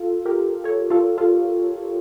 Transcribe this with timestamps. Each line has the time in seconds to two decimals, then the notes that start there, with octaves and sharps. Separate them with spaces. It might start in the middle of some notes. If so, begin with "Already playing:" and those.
Already playing: F4 A4
0.25 G4 A#4
0.64 A4 C#5
0.90 F4 A4
1.18 F4 A4